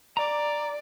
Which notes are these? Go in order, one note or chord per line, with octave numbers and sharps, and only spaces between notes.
D5 A#5 D6